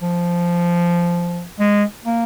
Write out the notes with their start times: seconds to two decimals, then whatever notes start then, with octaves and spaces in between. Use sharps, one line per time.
0.02 F3
1.60 G#3
2.05 A#3